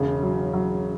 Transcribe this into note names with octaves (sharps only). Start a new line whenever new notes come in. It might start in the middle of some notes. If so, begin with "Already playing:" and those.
Already playing: E1 C#3
F#3
F#3